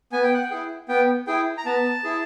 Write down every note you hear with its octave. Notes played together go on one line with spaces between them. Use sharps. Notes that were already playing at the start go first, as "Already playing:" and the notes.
B3 G#5
G5
F#5
G5
E4 G#4
B3 G5
E4 G#4 G5
A#5
B3 A5
E4 G#4